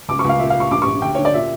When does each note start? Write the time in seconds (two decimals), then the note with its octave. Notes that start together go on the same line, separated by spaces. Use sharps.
0.08 C#2 D6
0.19 C#6
0.24 C#2 F5
0.39 A#2 E5
0.50 F5
0.55 A#2
0.60 C#6
0.71 A#1 D6
0.82 C#6
0.86 A#1
1.02 D2 G5
1.15 D3 C#5
1.25 D5
1.34 A#2 E5